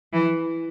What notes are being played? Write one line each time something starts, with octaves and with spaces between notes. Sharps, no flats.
E3